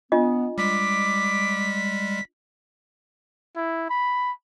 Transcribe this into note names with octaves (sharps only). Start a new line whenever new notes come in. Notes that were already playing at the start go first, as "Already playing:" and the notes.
B3 D4 F4 D#5
G3 G#3 D6 B6
E4
B5